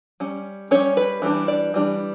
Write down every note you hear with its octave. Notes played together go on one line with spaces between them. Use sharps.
G3 C#4
G3 C#4 C#5
B4
E3 G3 D4
D5
E3 G3 D4